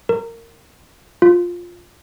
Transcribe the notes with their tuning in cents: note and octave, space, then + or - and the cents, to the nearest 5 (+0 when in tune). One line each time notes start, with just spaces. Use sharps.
A#4 -20
F4 +10